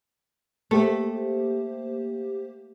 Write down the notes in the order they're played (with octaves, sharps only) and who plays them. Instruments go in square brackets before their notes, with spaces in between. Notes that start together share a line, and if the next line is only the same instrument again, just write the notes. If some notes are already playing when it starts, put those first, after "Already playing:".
[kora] A3 [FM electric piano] A#3 G4 C5